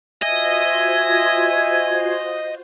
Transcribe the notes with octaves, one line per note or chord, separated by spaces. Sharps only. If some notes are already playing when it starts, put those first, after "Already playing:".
F4 F#4 C5 D#5 E5 G#5